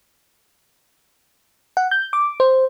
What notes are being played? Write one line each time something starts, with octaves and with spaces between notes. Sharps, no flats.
F#5
G6
D6
C5